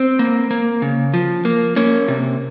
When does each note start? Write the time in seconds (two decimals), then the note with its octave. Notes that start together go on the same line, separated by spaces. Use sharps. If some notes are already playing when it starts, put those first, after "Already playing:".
Already playing: C4
0.19 A#3
0.51 A#3
0.82 C#3
1.14 F3
1.45 A#3
1.76 A#3 C#4
2.08 C3